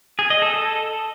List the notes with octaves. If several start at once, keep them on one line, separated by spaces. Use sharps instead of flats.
G#4
D#5
A4
A4